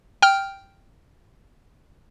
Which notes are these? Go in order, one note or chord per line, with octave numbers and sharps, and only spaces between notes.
G5 F6